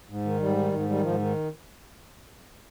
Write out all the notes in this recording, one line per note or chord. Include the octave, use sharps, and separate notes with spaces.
G#2
D#3
G#2 G3
D#3
G#2
D#3 G3
G#2 F3
D#3